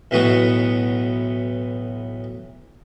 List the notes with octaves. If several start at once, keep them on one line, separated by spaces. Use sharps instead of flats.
B1 A2 E3 B3 F#4 C#6